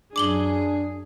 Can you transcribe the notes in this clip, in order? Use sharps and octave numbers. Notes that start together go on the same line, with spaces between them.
F#2 D4 G#4 D6 F#7 G7